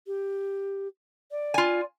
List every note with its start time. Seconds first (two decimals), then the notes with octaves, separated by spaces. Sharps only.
0.07 G4
1.31 D5
1.54 F4 G#5